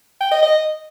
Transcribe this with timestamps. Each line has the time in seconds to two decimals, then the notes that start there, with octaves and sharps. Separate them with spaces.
0.20 G5
0.31 D#5
0.42 D#5